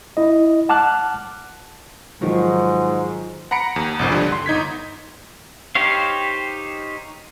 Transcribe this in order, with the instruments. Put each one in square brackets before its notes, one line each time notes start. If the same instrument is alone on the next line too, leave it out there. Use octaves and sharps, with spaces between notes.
[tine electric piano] E4 D#5
F#5 A5 D6 F6 F#6
[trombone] G#2 [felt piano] D#3 F3 F#3
[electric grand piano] F#5 A#5 B5 C#7 D7
D#2
G1 C2 F3
D3 G3
C6
G1 D#4 G#6 B6
[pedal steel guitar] D#4 G4 C5 C#5 F5